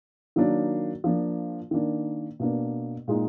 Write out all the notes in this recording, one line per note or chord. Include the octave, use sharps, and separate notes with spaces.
D#3 F#3 A#3 D4
F3 A#3 D4
D#3 A#3 D4
B2 A#3 D4
A#2 G#3 D#4